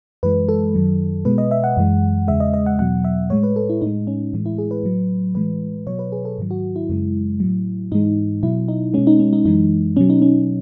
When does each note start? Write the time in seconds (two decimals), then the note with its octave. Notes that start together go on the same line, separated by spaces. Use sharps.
0.23 F#2 E3 G#3 B4
0.49 A4
0.74 F#2 D#3 F#3
1.25 B2 G#3 B4
1.38 D#5
1.51 E5
1.64 F#5
1.77 F#2 E3 G#3
2.28 E2 C#3 G#3 E5
2.40 D#5
2.54 D#5
2.66 F#5
2.79 E2 B2 F#3 F#5
3.04 E5
3.30 A2 G#3 C#5
3.43 B4
3.56 A4
3.69 E4
3.81 A2 G#3 D#4
4.07 C#4
4.33 A2 E3 G#3
4.46 E4
4.58 G#4
4.71 B4
4.84 A2 F#3
5.35 A2 E3 G#3 B4
5.87 B2 F#3 C#5
5.99 B4
6.12 G#4
6.25 A4
6.38 G#2 D#3 F#3
6.51 F#4
6.76 E4
6.89 F#2 C#3 G#3
7.40 A2 F#3
7.92 G#2 E3 G#3 D#4
8.43 B2 F#3 E4
8.68 D#4
8.94 B2 G#3 C#4
9.07 D#4
9.20 C#4
9.33 D#4
9.45 F#2 E3 G#3 D#4
9.97 B2 F#3 C#4
10.10 D#4
10.22 C#4